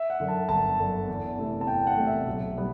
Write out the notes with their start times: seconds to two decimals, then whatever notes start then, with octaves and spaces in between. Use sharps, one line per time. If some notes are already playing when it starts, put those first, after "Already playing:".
Already playing: E5
0.10 F#5
0.20 F#2 D3
0.29 A5
0.49 G1 A5
0.78 F#2 D3
1.08 E2
1.38 C3 E3 A3
1.61 A5
1.67 E2 G5
1.87 F#5
1.97 C3 E3 A3
2.07 E5
2.27 B1
2.57 B2 G3 B3